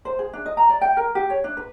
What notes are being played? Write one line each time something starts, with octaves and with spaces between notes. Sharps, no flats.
C5
G#4
D4
D#5
A#5
D5
G5
A#4
G4
C#5
D4
B4